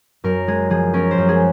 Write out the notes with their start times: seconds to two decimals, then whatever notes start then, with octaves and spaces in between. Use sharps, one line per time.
0.24 F#2 A#4
0.48 G#3 G#4
0.70 F3 G#4
0.94 C#4 A#4
1.11 C5
1.18 F#2
1.29 G#4